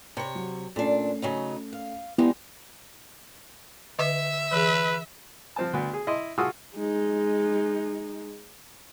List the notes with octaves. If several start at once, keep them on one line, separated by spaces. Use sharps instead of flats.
C3 C#5 B5 C#7
F#3
A#2 A3 C#4 D4 C7
C#3 F#3 D#4
F5
G3 G#3 B3 D#4 E4 G4
D3 B4 D#5 E5
E3 G#4 B4
F3 C4 A5
D2 B3
G#4
E4 D#5 C6
F4 F#4 G#4 C#6 D#6 E6
G#3 D#4